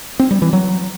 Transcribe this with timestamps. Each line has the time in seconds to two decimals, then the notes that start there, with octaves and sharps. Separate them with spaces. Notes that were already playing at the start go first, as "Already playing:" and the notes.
0.19 C4
0.31 G3
0.42 E3
0.53 F#3